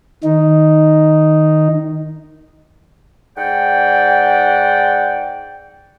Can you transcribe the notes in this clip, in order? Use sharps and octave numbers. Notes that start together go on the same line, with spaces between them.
D#3 D#4
G#2 D5 F#5 G5